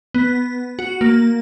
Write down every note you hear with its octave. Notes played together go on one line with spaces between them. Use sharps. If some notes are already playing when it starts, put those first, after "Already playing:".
B3
F#4
A#3